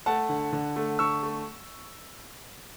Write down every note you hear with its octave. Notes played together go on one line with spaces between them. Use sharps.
A3 F#5 A5
D3
D3
A3
D3 C#6 E6
A3